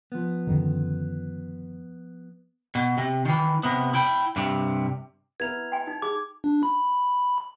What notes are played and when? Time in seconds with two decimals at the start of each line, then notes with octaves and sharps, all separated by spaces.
0.12 F3 B3
0.47 F#2 D3 D#3
2.75 B2
2.98 C3
3.25 D#3 E3
3.63 C3 B3
3.94 E4 G5
4.36 G2 C3
5.40 B3 E4 A#4 G#6 F7
5.72 G5 G#5
5.87 D#4
6.02 G#4 D6
6.44 D4
6.63 B5